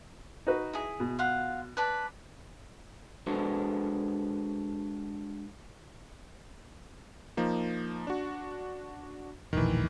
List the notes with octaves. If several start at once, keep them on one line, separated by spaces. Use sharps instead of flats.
D#4 F#4 B4
E4 G#4
B2
F4 F5 F#5
B4 D5 A5
G#3 D4 F#4 A4 B4 C5
F3 A#3 D#4
D4 F#4
E1 A#1 D#3 E3